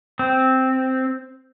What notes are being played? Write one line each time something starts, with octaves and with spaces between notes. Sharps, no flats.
C4